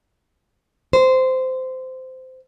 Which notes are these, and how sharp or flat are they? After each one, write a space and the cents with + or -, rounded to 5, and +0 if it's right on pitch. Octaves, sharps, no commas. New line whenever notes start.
C5 -15